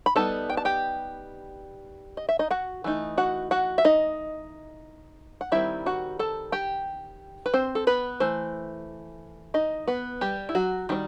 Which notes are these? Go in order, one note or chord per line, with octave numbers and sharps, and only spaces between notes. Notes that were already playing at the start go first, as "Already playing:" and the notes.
B5
G3 B3 D#4 A4 A5
G5
A5
G4 G5
D#5
E5
D#4 D#5
F#4 F#5
E3 A3 D#4
F#4 F#5
F#4 F#5
E5
D#4 D#5
F#5
D#3 G3 C4 E4 E5
F#4 F#5
A4 A5
G4 G5
B4
C4 C5
A4
B3 B4
E3 A3 C5
D#4 D#5
B3 B4
G3 G4
E4
F#3 F#4
D#3 G3 C4